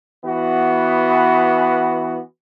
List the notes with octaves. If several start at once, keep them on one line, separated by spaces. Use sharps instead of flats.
E3 B3 F#4